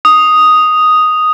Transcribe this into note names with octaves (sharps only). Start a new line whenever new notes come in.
D#6